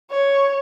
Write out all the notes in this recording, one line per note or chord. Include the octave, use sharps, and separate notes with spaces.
C#5